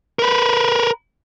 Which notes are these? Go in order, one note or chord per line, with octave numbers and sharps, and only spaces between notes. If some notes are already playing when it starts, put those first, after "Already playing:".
A#4 B4